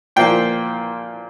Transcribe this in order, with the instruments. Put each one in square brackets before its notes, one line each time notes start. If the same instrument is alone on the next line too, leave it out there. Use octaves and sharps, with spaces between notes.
[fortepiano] A#2 F3 A#3 G5